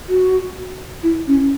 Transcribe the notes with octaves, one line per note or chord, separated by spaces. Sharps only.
F#4
E4
C#4